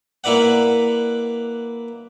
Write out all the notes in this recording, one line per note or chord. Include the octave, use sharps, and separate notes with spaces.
A#3 E4 B4 D5 F#5